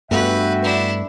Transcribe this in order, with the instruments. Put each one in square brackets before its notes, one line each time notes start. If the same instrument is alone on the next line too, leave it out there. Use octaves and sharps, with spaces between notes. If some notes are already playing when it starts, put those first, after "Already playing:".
[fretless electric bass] G2 A3 B3 [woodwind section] F#4 E5 G5 [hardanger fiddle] B4
[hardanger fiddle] D4 E4